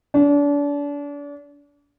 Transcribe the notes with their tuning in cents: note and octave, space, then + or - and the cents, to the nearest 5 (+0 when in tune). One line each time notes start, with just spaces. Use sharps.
D4 -35